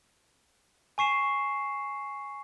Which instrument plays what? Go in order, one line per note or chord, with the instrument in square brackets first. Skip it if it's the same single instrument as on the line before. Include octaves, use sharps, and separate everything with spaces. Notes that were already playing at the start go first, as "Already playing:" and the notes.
[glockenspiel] G#5 C#6 C7 E7